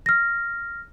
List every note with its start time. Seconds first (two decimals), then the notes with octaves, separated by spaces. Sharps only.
0.06 F6 A#6